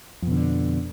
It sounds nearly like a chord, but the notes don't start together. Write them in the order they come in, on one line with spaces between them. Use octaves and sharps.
F2 B2 D3